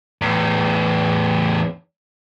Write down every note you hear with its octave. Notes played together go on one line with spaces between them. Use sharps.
E2 A2